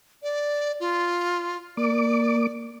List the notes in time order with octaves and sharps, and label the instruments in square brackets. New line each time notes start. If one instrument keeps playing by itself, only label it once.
[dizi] D5
F4
[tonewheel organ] A#3 D6 [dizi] D5